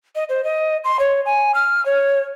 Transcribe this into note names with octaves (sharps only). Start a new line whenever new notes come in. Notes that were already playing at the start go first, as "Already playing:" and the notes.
D#5
C5
D#5
C6
C#5
G#5
F6
C#5